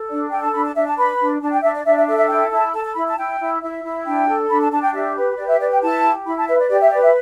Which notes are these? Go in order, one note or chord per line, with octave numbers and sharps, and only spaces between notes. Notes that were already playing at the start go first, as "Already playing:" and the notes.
Already playing: A4
D4 D5
A4 G5
A5
D4 B5
A5
D4 E5
A5
B4 B5
D4
D4 A5
G5
D4 E5
D5
D4 E5
E5
A4 E5
E5
E4 G5
E4 A5
A4 A5
A5
E4 B5
A5
E4 G5
E4
E4 E5
E4
D4 G5
A4
D4 B5
A5
D4 A5
G5
G4 E5
B4
G4 D5
E5
B4 D5
G5
E4 A5
G4
E4 B5
A5
B4 E5
D5
G4 D5
E5
B4 D5
E5